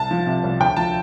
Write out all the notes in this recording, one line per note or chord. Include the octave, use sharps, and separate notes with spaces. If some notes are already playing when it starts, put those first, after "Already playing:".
Already playing: C2 A5
F3
C3
C2
D2 G5
F3 A5